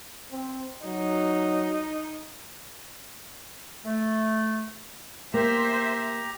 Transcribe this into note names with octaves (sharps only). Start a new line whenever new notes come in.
C4
F#3 D#4
A3
A#3 G4 C5 E5 A#5